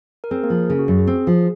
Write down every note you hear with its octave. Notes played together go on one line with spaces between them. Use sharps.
A#4
C4 G#4
A#3 A#4
F3
C#3 G#4
F#4
F#2 G#4
G#4
C4
F3